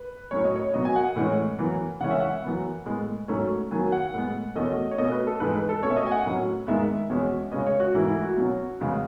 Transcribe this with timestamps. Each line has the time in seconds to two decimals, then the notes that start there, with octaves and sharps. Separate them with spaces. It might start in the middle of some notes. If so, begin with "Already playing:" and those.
Already playing: B4
0.31 A2 F#3 C#4 C#5
0.45 D#5
0.56 C#5
0.74 B2 F#3 B3 D#5
0.85 G#5
0.96 F#5
1.16 A2 E3 G#3 C#4
1.58 F#2 E3 B3
2.01 C#3 E3 G#3 C#4 F#5
2.11 E5
2.20 F#5
2.44 F#2 E3 B3
2.85 A2 G#3 B3
3.28 G#2 F#3 A3 C#4
3.71 F#2 D#3 F#3 B3 G#5
3.92 F#5
4.14 A2 G#3 B3
4.55 E2 B2 A3 C#4 D#5
4.91 C#5
4.98 B2 A3 C#4 D#5
5.11 B4
5.27 A4
5.40 G#2 E3 G#3 B4
5.55 B4
5.69 A4
5.82 B2 A3 C#4 C#5
5.90 E5
5.96 D#5
6.07 G#5
6.11 F#5
6.25 A2 F#3 C#4
6.67 G#2 D#3 G#3 B3 E5
7.10 E2 B2 G#3 C#4
7.52 C#3 G#3 C#4 D#5
7.66 C#5
7.80 F#4
7.95 G#2 E3 A3 E4
8.08 E4
8.22 F#4
8.37 B2 F#3 C#4
8.80 E2 C#3 G#3 B3